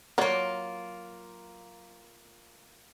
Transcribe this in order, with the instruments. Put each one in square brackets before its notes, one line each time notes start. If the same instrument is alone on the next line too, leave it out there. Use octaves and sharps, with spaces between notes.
[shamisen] F#3 C#5 D5 [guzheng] A#3 F4